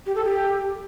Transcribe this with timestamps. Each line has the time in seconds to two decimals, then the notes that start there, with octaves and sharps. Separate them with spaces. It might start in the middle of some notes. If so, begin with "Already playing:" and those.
0.06 G4
0.16 A4
0.25 G4